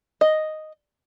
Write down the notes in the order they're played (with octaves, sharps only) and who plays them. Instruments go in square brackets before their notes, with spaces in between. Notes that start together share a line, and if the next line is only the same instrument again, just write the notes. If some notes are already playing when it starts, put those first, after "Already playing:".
[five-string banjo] D#5